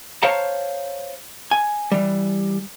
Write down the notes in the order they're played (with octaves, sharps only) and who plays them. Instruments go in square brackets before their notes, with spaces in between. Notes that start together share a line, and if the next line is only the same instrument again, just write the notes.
[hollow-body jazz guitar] C5 C#5 F5 A5 A#5
G#5
E3 G3